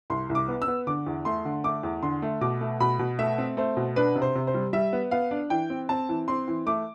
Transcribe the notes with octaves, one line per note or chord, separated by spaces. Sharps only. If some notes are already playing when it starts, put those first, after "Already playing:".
C2 C6
C2
D6
B3
E6
B3
D3 D6
E2
A3 C6
D3
A3 D6
E2
D3 C6
A3
B2 D6
A3
B2 B5
B2
A3 E5
C4
A3 C5
B2
D4 B4
C3
C5
C3
C5
G3
G3 E5
B3
B3 F5
D4
E3 G5
C4
C4 A5
E3
C4 C6
E3
A3 D6